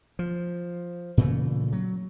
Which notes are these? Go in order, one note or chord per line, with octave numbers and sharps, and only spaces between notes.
F3
A#2 C#3 E3 A3
F#3